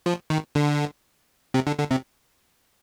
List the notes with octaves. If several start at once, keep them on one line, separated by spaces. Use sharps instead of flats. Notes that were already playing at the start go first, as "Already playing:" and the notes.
F3
D#3
D3
C3
D3
D3
C3